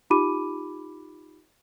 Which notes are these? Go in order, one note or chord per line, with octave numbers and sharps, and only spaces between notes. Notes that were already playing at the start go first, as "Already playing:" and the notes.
D#4 F4 G4 B5 D6 D#7